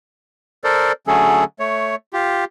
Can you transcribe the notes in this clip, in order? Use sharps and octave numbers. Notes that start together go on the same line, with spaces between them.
A4 A#4 C5 D5
D3 F#3 A3 C#4 G#4 A4
A3 C#5
F4 G4